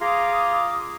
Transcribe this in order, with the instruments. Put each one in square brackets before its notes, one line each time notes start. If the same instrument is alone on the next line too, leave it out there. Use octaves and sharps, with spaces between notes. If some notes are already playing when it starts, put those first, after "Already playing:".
[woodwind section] F4 G#4 A#5 D6 D#6